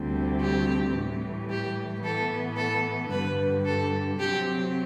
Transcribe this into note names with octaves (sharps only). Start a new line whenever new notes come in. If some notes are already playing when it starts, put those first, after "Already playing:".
Already playing: D2 C3 G3 C4
G4
A2 E3 G3
G4
A2 E3 B3 A4
A4
G2 D3 G3 B4
A4
C3 F#3 C4 G4